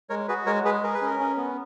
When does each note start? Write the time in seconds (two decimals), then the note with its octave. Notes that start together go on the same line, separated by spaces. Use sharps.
0.09 G#3 A#4 C#5
0.28 F#4 G#4 B4
0.46 G#3 A#4 C#5
0.64 G#3 G#4 B4
0.83 G#4 A#4
0.94 B4
1.01 C#4 A#4
1.19 C#4
1.37 B3